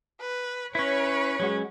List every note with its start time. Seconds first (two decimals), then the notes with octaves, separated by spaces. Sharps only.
0.21 B4
0.75 C#4 E4 B4 C#5
1.40 F#3 G#3 C#4 F#4